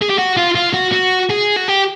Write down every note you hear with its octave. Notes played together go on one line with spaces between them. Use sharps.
G#4
G4
F#4
F4
F4
F#4
F#4
G#4
F#4
G4